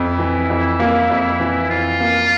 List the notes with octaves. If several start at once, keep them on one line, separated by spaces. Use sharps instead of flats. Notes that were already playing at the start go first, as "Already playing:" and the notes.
Already playing: F2 E4
E3
F2
A#3
F2
E3
F2 F4
A#3